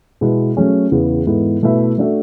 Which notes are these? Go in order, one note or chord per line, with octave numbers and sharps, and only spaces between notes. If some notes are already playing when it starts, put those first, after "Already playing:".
B2 G#3 B3 E4 B4
F#3 A3 C#4 G#4
E2 C#3 E3 B3
G#2 E3 B3 E4 A4
B2 A3 E4 B4 E5
A3 D4 F#4 A4 E5